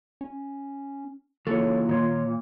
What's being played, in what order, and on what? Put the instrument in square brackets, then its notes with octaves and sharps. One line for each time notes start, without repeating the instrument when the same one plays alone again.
[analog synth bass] C#4
[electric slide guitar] C#3 E3 F#3 [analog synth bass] A#3 [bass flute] F4 [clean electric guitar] A4 C#5
[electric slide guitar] A#2 [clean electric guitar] D#3 C#5 C6